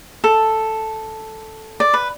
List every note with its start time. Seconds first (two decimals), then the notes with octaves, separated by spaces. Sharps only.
0.24 A4
1.80 D5
1.94 B4